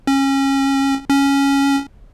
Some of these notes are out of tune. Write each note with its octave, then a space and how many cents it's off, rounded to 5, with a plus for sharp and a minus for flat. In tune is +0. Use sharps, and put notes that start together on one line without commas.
C#4 -25
C#4 +0